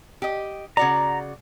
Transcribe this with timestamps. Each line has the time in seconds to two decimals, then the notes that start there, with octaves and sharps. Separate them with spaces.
0.22 G4 D#5
0.77 C#3 F#4 D5 A#5